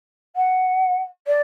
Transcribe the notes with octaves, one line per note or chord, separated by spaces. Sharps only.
F#5
D5